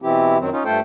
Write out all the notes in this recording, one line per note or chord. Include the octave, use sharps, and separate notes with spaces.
B2 E3 C4 E4 G4
F#2 D#3 F#3 C4
C#4 D#4 F4
G2 A3 F4 A4 C5 G5